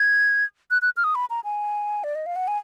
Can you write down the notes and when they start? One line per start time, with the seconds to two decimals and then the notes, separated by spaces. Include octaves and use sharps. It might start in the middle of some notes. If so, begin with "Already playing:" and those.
Already playing: G#6
0.71 F#6
0.82 F#6
0.97 F6
1.04 D#6
1.15 B5
1.30 A#5
1.44 G#5
2.04 D5
2.15 D#5
2.26 F5
2.36 F#5
2.48 G#5